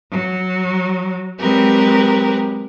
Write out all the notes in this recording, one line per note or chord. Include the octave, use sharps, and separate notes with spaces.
F#3
F#3 G#3 C4 G4 A#4 B4